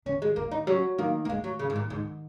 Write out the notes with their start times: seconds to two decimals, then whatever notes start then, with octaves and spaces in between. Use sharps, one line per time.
0.06 D#3 C#4
0.22 G#3
0.36 D#3 A#3
0.52 D#4
0.67 F#3 C#4
0.98 D#3 A#3
1.25 A#3
1.29 D#3 G#3
1.44 F#3
1.59 C#3
1.70 G#2
1.76 A#2
1.90 G#2 D#3